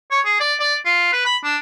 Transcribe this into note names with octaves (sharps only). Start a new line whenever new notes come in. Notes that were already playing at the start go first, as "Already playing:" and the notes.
C#5
G#4
D5
D5
F4
B4
B5
D4